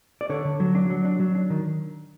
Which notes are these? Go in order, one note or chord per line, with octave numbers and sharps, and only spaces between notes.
D5
D3 C#5
D3
F#3
D4
F#3
D4
F#3
D4
D#3